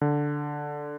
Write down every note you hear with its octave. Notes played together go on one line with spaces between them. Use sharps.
D3